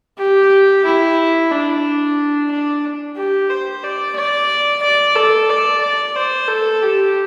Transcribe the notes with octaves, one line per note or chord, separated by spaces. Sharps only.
G4
E4
D4
D4
G4
C5
D5
D5
D5
A4
D5
D5
C5
A4
G4